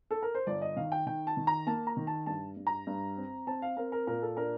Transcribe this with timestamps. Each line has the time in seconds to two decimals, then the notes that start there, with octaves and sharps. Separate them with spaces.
0.11 A4
0.22 A#4
0.35 C5
0.47 G1 D5
0.61 D#5
0.76 D#3 F5
0.92 G5
1.06 D#3 G5
1.27 A5
1.37 D#3
1.47 A#5
1.67 A#3 A5
1.87 A#5
1.97 D#3
2.07 A5
2.26 G2 A5
2.57 G2
2.67 A#5
2.87 G2
3.17 C4
3.47 C4 A5
3.62 F5
3.77 C4 A#4
3.92 A#4
4.07 A#2 A#4
4.22 A4
4.37 D4 A#4